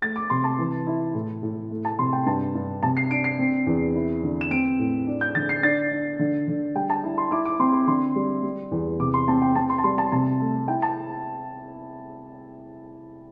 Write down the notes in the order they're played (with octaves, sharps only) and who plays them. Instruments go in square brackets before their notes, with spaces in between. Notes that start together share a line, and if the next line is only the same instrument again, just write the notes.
[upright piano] A3 A6
D6
C3 C6
A5
E3
E4
A2
A2
A3
A5
C3 C6
G5
G2 A5
G2
C3 A5
C7
D4 D7
C7
C4
E2
E4
D3
E7
C4 D7
A2
D4
G6
D3 A6
C7
D4 A6
D4
D3
D3
G3 G5
A5
E4
C6
E4 D6
D6
C4 C6
C6
D3 C6
G3
G3
E2
C3 D6
C6
C4 A5
G5
C4 A5
C6
A5
G3 C6
A5
C3 A5
A3
E4 G5
A5